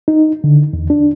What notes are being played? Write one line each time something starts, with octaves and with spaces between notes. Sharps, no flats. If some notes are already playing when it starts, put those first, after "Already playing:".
D#4
D3
E2
D4